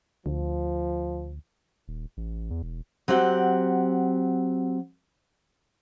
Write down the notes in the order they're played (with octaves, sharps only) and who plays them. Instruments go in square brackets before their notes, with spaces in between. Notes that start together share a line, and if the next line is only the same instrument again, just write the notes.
[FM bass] D2 [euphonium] F3
[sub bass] D#1
A1
E2
E1
[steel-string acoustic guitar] F#3 C4 G4 F#5